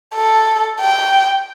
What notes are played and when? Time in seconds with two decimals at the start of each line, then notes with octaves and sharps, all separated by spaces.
0.15 A4
0.80 G5